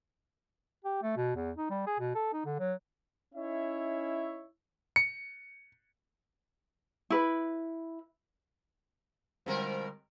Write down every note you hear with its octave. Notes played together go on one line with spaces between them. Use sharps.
G4
A3
B2
E2
D#4
G3
G#4
B2
A4
D#4
D3
F#3
C#4 D#4 E4 C#5 E5
C#7
E4 B4
B2 D3 F3 G3 G#3 C4 A#4